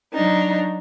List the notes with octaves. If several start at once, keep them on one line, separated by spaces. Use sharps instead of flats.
F#3 D4 D#4